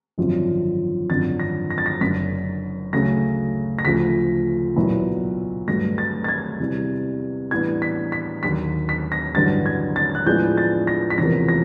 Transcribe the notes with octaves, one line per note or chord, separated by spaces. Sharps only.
G#1 F#2 D3 F3
G#1 F#2 D3 F3 A6
A#6
A#6
A6
A#6
F#1 F#2 D3 B6
D2 C#3 F#3 A3 A#6
A#6
D2 C#3 F3 A3 B6
B1 A#2 F#3 B3 E4
G2 D3 F#3 A3 A#6
A6
A6
G#6
E2 C3 E3 G3
A2 E3 G3 B3 D4 G#6
B6
B6
D#2 D3 F#3 B6
B6
A#6
A1 G2 D3 F#3 A6
G#6
A6
F#6
A2 F3 G#3 B3 D4 G6
A6
A#6
B6
E1 E2 C3 F3 A#3 A#6
A#6